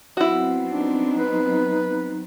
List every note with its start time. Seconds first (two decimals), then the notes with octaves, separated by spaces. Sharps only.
0.17 F#3 B3 C4 E4 F#4
0.69 D4 D#4
1.19 B4